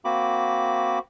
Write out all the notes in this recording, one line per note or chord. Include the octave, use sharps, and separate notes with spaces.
A#3 C4 F#4 B5 D6